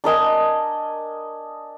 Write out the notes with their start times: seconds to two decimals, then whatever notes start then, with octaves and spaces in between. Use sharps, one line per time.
0.04 D4 A#4 D#5 G#5